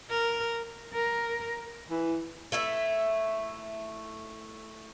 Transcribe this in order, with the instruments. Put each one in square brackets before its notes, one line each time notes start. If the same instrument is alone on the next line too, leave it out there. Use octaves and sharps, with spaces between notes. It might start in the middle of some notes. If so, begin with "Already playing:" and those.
[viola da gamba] A#4
[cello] A#4
[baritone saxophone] E3
[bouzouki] A3 E4 E5